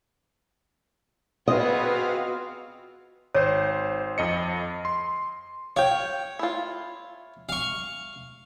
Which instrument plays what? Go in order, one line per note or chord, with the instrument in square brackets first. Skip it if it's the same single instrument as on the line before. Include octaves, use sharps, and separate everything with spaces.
[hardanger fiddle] B3 B4 [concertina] C4 F4 G#4 [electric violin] F#4 F5 [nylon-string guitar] D#5
[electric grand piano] G#1 C5 [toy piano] C#5
[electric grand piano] F2 D#5 C#7
C6
[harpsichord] C#5 [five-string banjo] F5 G5
[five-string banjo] E4 F4
[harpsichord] F5 C#6